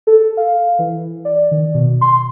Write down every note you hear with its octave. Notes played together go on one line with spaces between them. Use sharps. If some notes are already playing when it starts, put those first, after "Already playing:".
A4
F5
E3
D5
D#3
B2
C6